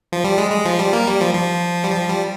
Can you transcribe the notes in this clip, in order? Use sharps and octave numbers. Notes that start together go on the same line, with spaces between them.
F3
G3
G#3
G#3
F3
G3
A#3
G3
F3
F3
G3
F3
G3